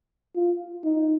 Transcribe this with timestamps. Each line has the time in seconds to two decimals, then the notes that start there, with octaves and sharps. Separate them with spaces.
0.35 F4
0.84 D#4